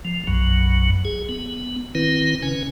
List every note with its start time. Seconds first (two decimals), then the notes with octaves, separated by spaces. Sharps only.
0.05 F3
0.27 B1 F#2 F#3
1.05 G#4
1.29 B3
1.95 D#3 C4 E4 B4
2.43 C#3 C#4 B4 G#5